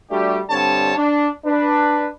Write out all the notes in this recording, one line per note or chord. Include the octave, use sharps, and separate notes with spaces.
G3 A3 D4 F#4 G4
G2 D3 G3 C4 C#5 A5
D4
D4 B4